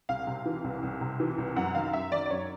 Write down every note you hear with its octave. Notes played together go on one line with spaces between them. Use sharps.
C2 F5
C3
E3
C2
C2
C3
E3
C2
F#2 F#5
D#3 F5
F#2 E5
D#3 D5
D5
F#2 C#5